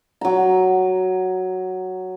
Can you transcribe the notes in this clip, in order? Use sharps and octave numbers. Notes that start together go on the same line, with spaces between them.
F#3 A#5